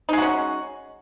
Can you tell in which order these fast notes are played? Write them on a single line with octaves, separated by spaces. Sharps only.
D#4 G#3 F#4 C#4